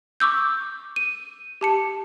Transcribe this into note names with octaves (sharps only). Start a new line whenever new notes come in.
C#6 D6 E6 G6
D#7
G4 A5 C#7